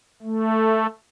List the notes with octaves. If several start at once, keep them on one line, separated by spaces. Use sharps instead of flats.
A3